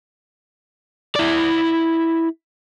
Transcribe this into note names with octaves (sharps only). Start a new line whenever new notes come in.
E4 D5